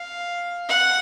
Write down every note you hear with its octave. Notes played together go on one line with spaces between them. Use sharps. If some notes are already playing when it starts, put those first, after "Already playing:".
Already playing: F5
F#5